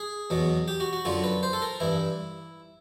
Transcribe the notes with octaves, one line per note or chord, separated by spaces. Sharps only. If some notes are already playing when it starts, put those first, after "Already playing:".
Already playing: G#4
E2 B2 F#3
G4
F#4
F#4
F#2 D3 F#3 F4
B4
C5
A4
A#4
G2 E3 E4